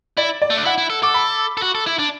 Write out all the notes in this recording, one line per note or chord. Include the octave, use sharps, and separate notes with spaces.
E4 D5
D5
A3
D4
E4 F#5
E4
A4
A4 D6
B5
A4
F#4
A4
E4
D4